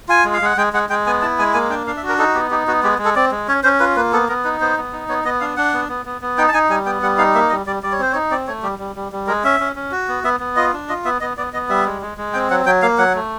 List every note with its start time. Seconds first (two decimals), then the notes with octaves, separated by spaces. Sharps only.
0.09 F4 G#5
0.25 G#3
0.33 F5
0.42 G#3 F#5
0.57 G#3 G5
0.73 G#3 F#5
0.90 G#3 G5
1.06 B3 G#5
1.22 E4 A5
1.39 G#3 G#5
1.54 A#3 G#5
1.70 D4 G5
1.87 D4 F5
1.97 E5
2.03 F#4
2.09 A#4
2.18 D#4 A4
2.35 B3 G4
2.50 D#4 G4
2.67 B3 F#4
2.83 G#3 G4
2.99 G#3
3.05 A4
3.16 C4 D5
3.32 G#3
3.48 C#4 C#5
3.63 C#4 C5
3.80 F4 B4
3.96 A#3 B4
4.12 B3 A4
4.28 B3 A#4
4.44 D#4 B4
4.61 B3 C5
4.77 B3
4.93 D#4
5.08 B3 C#5
5.24 B3 D#5
5.40 D4 F5
5.57 D4 F#5
5.74 B3
5.89 B3
6.06 B3
6.21 B3
6.38 D#4 G5
6.48 A5
6.54 D#4 G#5
6.69 G3 G#5
6.85 B3 G5
7.02 G3 F#5
7.18 D#4 F5
7.34 A#3 E5
7.50 G3 D#5
7.66 G3 D5
7.83 G3 D5
7.92 C#5
7.99 C4 C5
8.12 C#5
8.15 D#4
8.31 C4 D5
8.47 A3 C#5
8.63 G3 G4
8.79 G3
8.96 G3
9.12 G3
9.27 G#3 A#4
9.44 C#4 E5
9.60 C#4
9.76 C#4
9.92 F#4
10.08 B3
10.24 B3 E5
10.40 B3
10.56 F4 D#5
10.73 D4
10.89 F4 D#5
11.05 B3 E5
11.21 B3 D#5
11.37 B3 D5
11.53 B3 D#5
11.69 G3 E5
11.85 G#3
12.02 G#3
12.18 G#3
12.33 C4 G5
12.50 F#3 F#5
12.66 F#3 G5
12.82 A#3 F5
12.98 F#3 F#5
13.15 A3